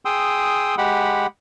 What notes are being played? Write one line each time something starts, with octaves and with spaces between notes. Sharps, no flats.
G#4 G5 C6 D#6 E6
G#3 G4 F#5 B5